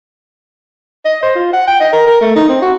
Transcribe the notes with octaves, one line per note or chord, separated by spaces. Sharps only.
D#5
C5
F4
F#5
G5
D#5
A#4
A#4
A3
D#4
C4
F#4